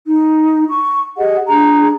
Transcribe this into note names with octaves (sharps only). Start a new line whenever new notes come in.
D#4
C#6
G4 G#4 D#5 F#5
D4 G#4 A#5